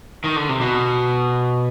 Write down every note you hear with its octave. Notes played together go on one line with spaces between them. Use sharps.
D#3
D3
C3
B2